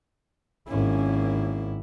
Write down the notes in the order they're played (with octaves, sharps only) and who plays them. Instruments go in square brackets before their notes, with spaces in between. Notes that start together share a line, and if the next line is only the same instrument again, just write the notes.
[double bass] G#1 E4 [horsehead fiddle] A#3 C#4